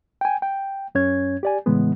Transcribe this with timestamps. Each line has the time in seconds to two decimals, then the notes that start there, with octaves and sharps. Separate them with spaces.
0.21 G5 G#5
0.42 G5
0.95 F#2 C#4 C#5 G#6
1.43 G4 D5 G#5
1.66 A2 C#3 E3 G#3 B3